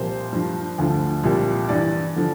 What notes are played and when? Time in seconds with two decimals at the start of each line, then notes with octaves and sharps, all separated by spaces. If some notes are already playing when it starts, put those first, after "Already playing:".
Already playing: C2 A#2 F3 C5
0.33 G2 F3
0.78 D2 D3 F3
1.23 C2 A#2 F3
1.69 G2 E3 D5
2.16 D3 F3